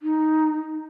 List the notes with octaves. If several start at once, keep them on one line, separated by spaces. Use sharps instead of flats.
D#4